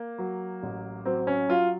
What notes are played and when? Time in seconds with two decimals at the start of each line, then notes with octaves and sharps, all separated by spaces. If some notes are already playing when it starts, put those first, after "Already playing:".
Already playing: A#3
0.18 F#3
0.63 A1
1.05 F#3 C4
1.27 C#4
1.48 F#3 F4